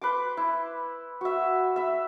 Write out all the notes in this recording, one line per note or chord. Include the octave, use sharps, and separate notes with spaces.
B4 C6 D6
E4
F#4 E5
E5 B5